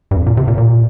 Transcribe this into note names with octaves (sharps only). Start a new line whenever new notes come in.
G2
F2
A#2
C3
A#2
A#2